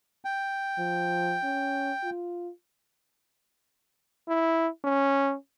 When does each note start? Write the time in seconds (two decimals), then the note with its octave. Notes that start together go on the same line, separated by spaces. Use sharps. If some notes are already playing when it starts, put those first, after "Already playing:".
0.25 G5
0.79 F3
1.44 C#4
2.03 F4
4.29 E4
4.85 C#4